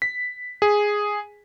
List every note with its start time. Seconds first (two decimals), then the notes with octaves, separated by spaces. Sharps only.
0.02 B6
0.62 G#4